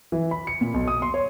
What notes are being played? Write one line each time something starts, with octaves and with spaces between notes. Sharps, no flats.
E3
B5
C#7
A#2
B1
D#6
C6
C#5